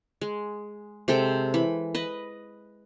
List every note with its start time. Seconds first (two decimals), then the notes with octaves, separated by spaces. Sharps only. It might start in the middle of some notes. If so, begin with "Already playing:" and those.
0.21 G#3
1.08 C3 G#3 A4 G5
1.54 E3 B5
1.95 B4 D#5